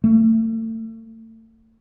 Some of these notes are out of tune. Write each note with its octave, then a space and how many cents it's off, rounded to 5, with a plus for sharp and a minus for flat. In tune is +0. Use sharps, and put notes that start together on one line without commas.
A3 +35